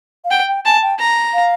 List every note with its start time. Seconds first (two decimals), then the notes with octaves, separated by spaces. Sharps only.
0.25 F5
0.30 F#5 G5
0.48 G5
0.65 G#5 A5
0.82 G5
0.99 A#5
1.34 F5